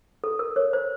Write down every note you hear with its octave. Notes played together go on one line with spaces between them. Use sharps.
A4
A#4
A#4 C#5
C5